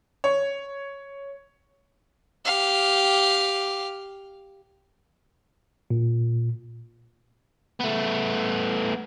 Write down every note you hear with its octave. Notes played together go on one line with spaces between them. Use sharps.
C#5
G4 F5
A#2
A3 B3